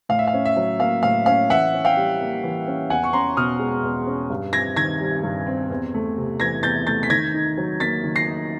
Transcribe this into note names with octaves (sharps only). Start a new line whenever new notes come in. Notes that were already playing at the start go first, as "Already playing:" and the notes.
A2 F5
E5
F5
C#4
E5
F#3
A#3 F5
A2 F5
C#4 F5
E3 E5 F#5
C#4
F5 G5
G3
A#3
E3
C#4
E2 F#5 G#5
C#6
C#4 A#5 C6
B2 D#6 F6
G#3
E2
C#4
G2
C4 G#6 A#6
D#3 G#6 A#6
G3
G2
C4
E2
A3
C3
E3 G#6 A#6
E2 G6 A6
A3 G6 A6
B6
D#3 G#6 A#6
D#4
F#3
A#3 A6 B6
D#3
A#6 C7
D#4